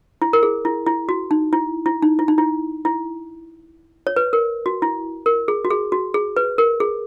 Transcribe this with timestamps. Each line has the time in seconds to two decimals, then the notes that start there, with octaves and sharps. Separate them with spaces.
0.22 E4
0.33 A#4
0.43 G#4
0.65 E4
0.86 E4
1.09 F#4
1.31 D#4
1.53 E4
1.86 E4
2.02 D#4
2.19 E4
2.28 D#4
2.38 E4
2.85 E4
4.07 C#5
4.16 B4
4.33 A#4
4.66 F#4
4.82 E4
5.26 A#4
5.48 G#4
5.65 F#4
5.70 G#4
5.92 F#4
6.14 G#4
6.37 B4
6.58 A#4
6.80 G#4